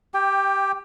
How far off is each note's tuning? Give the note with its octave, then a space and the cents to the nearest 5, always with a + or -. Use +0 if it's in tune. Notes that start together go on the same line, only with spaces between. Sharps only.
G4 +0 G5 +15